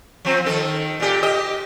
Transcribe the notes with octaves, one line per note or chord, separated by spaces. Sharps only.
F3 C4
D#3 A4
A#2 G4
G4 D#5